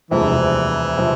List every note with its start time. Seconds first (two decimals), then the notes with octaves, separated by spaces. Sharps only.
0.11 E1 D2 C3 E3 F3 C4
0.98 C3 F3 C4